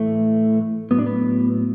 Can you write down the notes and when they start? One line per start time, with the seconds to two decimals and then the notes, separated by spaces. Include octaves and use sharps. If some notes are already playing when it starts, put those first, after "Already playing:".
Already playing: A2 E3 A3
0.91 A2 F#3 B3
0.99 D4
1.06 B3